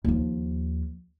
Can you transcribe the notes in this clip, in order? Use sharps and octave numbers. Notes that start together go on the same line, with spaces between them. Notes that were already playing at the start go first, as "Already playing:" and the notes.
D#2 F3